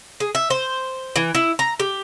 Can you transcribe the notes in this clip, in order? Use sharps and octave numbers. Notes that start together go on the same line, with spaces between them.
G#4
E5
C5
E3
E4
A#5
G4